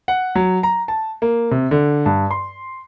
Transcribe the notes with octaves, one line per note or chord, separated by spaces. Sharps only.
F#5
F#3
A#5
A5
A#3
C3
D3
G2
C6